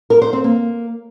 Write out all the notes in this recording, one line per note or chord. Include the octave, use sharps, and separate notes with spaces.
A#4
C5
C4
A#3